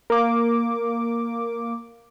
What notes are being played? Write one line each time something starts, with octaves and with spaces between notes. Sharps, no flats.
A#3 D6